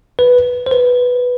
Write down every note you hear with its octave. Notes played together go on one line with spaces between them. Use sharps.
B4
C5
B4